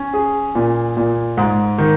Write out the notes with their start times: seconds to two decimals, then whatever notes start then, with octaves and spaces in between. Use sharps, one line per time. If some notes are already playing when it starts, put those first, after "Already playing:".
Already playing: C#4
0.14 G#4
0.55 A#2
0.97 A#2
1.37 G#2
1.78 D#3